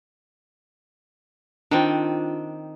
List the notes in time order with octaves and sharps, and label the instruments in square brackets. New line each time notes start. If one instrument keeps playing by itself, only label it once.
[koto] D#3 C4 [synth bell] D4 F4